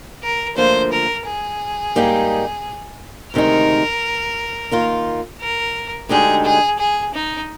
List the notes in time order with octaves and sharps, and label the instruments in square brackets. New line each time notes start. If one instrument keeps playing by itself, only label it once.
[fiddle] A#4
[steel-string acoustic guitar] D2 D3 F3 A#3 [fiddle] C5
[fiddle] A#4
G#4
[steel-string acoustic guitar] G#2 G3 A#3 D#4 G4
[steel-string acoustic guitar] D2 C3 D#3 G#3 D#4 [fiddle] A#4
[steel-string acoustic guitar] D#3 A#3 F4
[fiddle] A#4
[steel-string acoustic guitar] D2 D3 G#3 D#4 G4 [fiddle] G#4
[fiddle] G#4
G#4
D#4